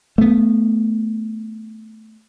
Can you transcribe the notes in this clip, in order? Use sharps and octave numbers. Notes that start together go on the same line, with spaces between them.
A3 B3